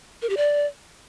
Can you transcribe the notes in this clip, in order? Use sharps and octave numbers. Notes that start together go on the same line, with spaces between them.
A#4
G4
D5